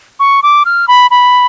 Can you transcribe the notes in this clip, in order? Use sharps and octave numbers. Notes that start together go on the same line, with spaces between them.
C#6
D6
F6
B5
B5